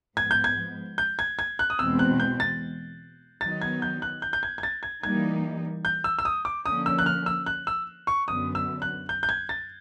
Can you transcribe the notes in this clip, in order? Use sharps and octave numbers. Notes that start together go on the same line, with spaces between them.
G#2 F3 G#3 B3 G#6
G6
G#6
G6
G#6
G#6
F#6
D#6
E2 B2 G#3 C4 E6
F#6
G6
A6
D#3 F#3 B3 D#4 A6
G#6
G6
F#6
G6
G6
G#6
G#6
A6
G#6
E3 G3 A#3 D#4 G#6
G6
E6
E6
D#6
D6
D3 F3 A#3 C#4 D#6
E6
F#6
F6
E6
F#6
E6
C#6
F#2 D3 F#3 B3 D#6
E6
F#6
G6
G6
G#6
A6